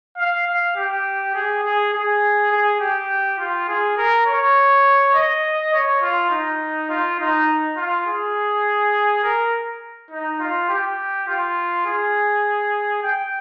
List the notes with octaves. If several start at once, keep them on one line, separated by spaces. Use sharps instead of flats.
F5
F5
G4
G#4
G#4
G#4
G#4
G4
F4
G#4
A#4
C#5
D#5
C#5
F4
D#4
F4
D#4
F4
G#4
A#4
D#4
F4
G4
F4
G#4
G5